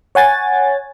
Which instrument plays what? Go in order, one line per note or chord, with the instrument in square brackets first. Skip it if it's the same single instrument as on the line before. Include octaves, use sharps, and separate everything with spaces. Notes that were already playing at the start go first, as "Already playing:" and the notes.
[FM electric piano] C#5 F#5 G#5 A6